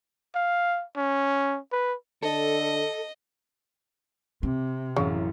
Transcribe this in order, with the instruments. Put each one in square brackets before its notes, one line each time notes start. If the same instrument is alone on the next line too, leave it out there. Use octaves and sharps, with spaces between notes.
[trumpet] F5
C#4
B4
[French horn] D3 [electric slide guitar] A4 [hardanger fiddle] D#5
[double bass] C3 [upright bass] C4
[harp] A1 F#2 [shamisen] C#3